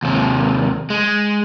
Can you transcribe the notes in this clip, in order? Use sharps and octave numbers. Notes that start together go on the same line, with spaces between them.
D#2 C3
G#3